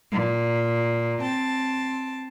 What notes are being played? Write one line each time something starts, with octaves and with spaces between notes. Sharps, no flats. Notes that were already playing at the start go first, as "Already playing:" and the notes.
A#2
C4 A5